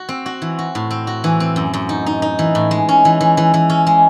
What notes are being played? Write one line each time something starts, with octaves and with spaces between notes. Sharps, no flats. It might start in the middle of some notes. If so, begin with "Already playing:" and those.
Already playing: F#4
C4
F#4
E3
F#4
A2
C4
F#4
E3
C4
F#2
F#2
D#4
D#4
D#4
E3
A2
G#3
C#4
E3
E3
E3
E3
C#4
G#3